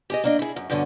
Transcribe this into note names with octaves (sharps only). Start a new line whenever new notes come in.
G4 G#4 D#5
A#3 D4 D#5
E4 G#4
F#2
G2 B2 D3 C#4